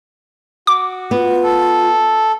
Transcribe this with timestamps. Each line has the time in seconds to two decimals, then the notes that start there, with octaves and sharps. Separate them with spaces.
0.67 F#4 D6
1.11 B3 F4
1.44 A4